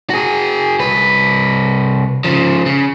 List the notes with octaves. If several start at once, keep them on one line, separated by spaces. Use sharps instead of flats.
F#4 G#4
C2 B4
C#3 F3
C#3